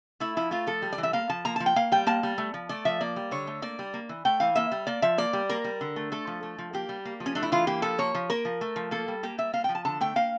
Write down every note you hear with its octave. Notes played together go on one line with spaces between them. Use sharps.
A3 E4
F3 E4
A3 F4
F3 A4
G3
D5
E3
E5
A#3 F5
F3 A5
A#3 A#5
F3 A5
G5
A#3 F5
G3 G5
A#3 A5
G3
A3
F3
A3 D5
F3 E5
A#3 D5
G3
D3 C#5
A3
A#3 D5
G3
A#3
E3
A3 G5
E3 F5
A#3 E5
G3
A#3 D5
F3 E5
A#3 D5
G3
A#3 A#4
G3
D3
A3
A3 A4
F3
A3
F3
A#3 G4
G3
A#3
F3
C#4
A3 D4
E4
E3 F4
A#3 G4
F3 A4
A#3 C#5
F3
A#3 A#4
F3
A3
F3
A#3 A4
G3
A#3 G4
G3 E5
A#3 F5
F3 G5
A5
D3 A5
A3 G5
A#3 F5